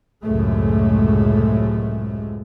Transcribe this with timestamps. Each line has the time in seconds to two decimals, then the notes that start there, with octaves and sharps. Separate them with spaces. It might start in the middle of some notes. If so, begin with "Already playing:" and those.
0.24 C#2 F#2 A2 C3 G#3 A3